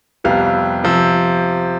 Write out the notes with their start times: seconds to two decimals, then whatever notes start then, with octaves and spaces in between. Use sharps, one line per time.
0.24 F2 C3 G3 B3 F5
0.84 C3 F3